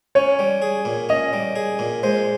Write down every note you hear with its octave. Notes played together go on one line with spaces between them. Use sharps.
C#4 C#5
G3
G#4
A#2
C#4 D#5
G3
G#4
A#2
G#3 C5